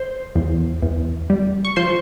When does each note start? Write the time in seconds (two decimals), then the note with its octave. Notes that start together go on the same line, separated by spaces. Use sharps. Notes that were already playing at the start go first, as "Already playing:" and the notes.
Already playing: C5 C6
0.36 E2
0.82 E2
1.30 G3
1.65 C#6
1.76 F3 C5 C6